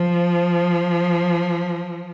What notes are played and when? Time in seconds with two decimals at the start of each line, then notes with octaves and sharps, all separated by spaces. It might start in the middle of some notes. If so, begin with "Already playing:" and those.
Already playing: F3